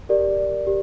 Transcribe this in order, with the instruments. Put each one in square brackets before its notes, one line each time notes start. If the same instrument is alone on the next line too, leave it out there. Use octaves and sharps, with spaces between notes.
[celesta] G4 A#4 D5
G4